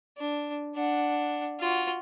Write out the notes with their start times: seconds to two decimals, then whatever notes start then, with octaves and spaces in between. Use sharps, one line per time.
0.17 D4
0.75 D4 F#5
1.60 F4 F#4